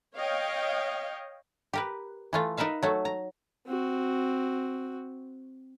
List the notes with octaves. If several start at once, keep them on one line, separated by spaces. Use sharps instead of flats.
C#5 D#5 F5 G5
G4 A#4 B4
E3 A3 F4
D#4 A#4 B4 E5 F5
F#3 A3
A#5
C4 F#4